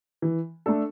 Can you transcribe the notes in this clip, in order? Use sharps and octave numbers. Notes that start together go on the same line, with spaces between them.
E3
A3 D4 A4